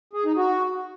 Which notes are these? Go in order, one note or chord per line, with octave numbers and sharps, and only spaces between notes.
G#4
D#4
F#4